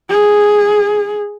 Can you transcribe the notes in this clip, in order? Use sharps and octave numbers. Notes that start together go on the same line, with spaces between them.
G#4